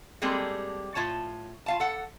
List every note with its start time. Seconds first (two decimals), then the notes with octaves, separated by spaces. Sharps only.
0.22 G3 G#3 A#3 C4 G#4 A4
0.95 A2 F4 C#5 A5
1.66 F4 F5 A5
1.80 A4 F#5